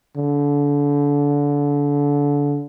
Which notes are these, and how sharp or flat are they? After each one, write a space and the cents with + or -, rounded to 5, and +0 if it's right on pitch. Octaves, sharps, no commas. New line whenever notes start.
D3 -30